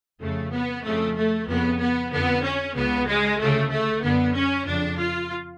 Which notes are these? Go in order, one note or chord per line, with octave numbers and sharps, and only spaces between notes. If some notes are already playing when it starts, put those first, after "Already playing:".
F2 C#3 A3
B3
F2 C#3 A3
A3
F2 C#3 B3
B3
F2 D3 B3
C#4
C#2 C#3 B3
G#3
D2 C#3 A3
A3
F#2 D3 B3
C#4
F2 C#3 D4
F4